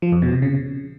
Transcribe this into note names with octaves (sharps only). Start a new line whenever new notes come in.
F3
F2
B2
C3
C#3